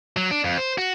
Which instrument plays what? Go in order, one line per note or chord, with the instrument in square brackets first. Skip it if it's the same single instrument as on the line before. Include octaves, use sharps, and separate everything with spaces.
[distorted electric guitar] F#3
D4
F2
C5
F#4